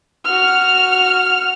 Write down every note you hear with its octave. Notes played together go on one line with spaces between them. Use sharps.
F#4 F6